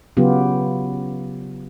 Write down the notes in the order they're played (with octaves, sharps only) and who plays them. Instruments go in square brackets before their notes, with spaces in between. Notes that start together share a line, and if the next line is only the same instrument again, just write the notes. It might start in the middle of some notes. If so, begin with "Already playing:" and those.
[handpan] C#3 F#3 B3 F4 G4